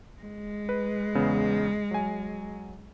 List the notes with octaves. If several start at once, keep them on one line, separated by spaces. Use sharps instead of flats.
G#3
B4
E2 C#3 B3
F#3 G#5